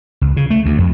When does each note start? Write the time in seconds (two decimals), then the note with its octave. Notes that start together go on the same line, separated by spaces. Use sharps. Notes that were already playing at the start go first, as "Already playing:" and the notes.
0.21 C#2
0.37 C#3
0.50 A3
0.66 D2
0.78 F2